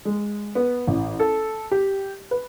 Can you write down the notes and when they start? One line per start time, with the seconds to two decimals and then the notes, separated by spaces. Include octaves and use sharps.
0.05 G#3
0.55 B3
0.87 A1
1.20 A4
1.71 G4
2.31 B4